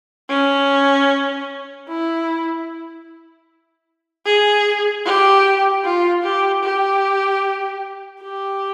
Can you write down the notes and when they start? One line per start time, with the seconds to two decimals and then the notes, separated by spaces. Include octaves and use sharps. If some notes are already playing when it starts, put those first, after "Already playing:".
0.30 C#4
1.88 E4
4.25 G#4
5.05 G4
5.84 F4
6.23 G4
6.63 G4
8.21 G4